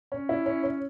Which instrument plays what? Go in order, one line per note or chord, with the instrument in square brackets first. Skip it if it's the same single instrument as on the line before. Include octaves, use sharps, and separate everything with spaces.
[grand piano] C#4
E4
C#4
C#4